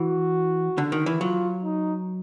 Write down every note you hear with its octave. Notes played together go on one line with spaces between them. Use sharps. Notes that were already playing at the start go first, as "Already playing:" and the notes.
Already playing: E3 F#4
D3
D#3
E3
F#3 F4
D#4